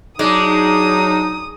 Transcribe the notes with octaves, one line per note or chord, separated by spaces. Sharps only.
F#3 G#3 D4 D#4 D#6